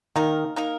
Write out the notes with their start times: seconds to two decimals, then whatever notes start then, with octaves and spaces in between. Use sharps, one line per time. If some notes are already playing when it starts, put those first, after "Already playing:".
0.16 D#3 A#3 D#4 A#4
0.56 A#3 D#4 A#4